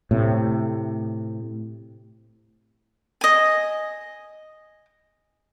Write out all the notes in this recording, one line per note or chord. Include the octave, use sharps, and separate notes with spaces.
A2 C3
D#5 G#5